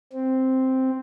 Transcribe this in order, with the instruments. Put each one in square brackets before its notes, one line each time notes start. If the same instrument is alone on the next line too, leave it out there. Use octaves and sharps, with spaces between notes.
[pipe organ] C4